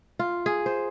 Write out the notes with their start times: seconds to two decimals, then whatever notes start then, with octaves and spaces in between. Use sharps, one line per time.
0.19 F4
0.46 G#4
0.66 C5